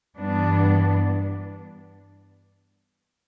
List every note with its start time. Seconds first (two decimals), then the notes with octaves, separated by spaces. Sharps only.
0.18 G2 E3 G3 B3 D4